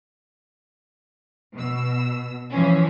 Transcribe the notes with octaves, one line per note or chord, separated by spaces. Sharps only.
B2 E6
E3 F3 C#4